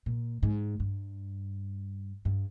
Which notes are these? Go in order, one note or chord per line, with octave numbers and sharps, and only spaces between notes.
A#2
G#2
G2
G2